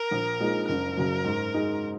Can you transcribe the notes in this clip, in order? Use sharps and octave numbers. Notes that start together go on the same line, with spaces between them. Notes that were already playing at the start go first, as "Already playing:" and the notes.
Already playing: A#4
A#1
A#2 G#3 D#4
F#1 A#4
F#2 C#3
G#2
G#3 D#4